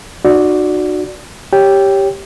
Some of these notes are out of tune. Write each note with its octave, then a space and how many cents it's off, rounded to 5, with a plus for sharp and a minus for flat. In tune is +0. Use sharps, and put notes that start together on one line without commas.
D#4 -40 F#4 -10 D5 +0
G4 +0 C#5 +0 G5 +0